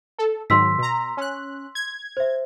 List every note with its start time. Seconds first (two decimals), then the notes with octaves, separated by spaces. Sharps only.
0.19 A4
0.50 G#2 D#3 F#3 C6 E6 B6
0.78 B2 A#5
1.17 C#4 F#6
1.75 G#6
2.17 C5 E5